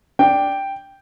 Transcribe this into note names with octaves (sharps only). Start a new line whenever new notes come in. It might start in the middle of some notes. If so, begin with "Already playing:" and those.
D4 G5